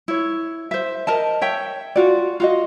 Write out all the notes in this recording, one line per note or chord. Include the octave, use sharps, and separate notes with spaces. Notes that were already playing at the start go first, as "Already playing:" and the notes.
E4 C#5
C5 E5
A#4 D#5 A5
C#5 E5 G5
F4 F#4 D5
F4 F#4 D#5